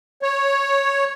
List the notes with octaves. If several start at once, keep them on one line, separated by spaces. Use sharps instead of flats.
C#5